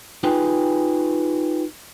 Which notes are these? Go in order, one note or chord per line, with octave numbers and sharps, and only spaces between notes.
D#4 F4 G4 G#4 B4 G5